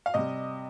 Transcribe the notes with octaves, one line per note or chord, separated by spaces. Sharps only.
F5
C3 G3 D#5